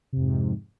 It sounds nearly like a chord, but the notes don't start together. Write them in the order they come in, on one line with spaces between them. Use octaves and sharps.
C3 F2 G#2